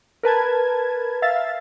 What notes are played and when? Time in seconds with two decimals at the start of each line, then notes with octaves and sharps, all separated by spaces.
0.23 A#4 B4 A5 G#6
1.22 E5 F5 A6